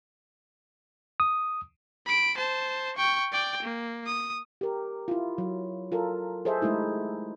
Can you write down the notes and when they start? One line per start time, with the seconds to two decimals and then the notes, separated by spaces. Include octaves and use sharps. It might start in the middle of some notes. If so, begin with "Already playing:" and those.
1.20 D#6
2.06 B5 D7
2.37 C5 A5
2.96 G5 C#6
3.32 D5 G5
3.62 A#3
4.06 D#6
4.61 G4 A#4
5.08 E4 F4
5.38 F#3
5.92 F4 A4 A#4
6.45 G#4 A4 C5 D#5 E5
6.61 G#3 A3 D#4 E4 G4